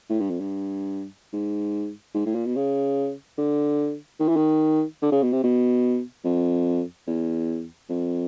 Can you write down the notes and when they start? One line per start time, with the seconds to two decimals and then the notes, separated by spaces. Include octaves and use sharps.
0.10 A2
0.20 G2
0.30 F2
0.41 G2
1.33 G#2
2.15 G#2
2.26 A2
2.35 A#2
2.46 B2
2.56 C#3
3.38 D3
4.20 D#3
4.29 E3
4.36 D#3
5.02 D3
5.12 C#3
5.23 B2
5.33 C3
5.44 B2
6.25 F2
7.07 E2
7.90 F2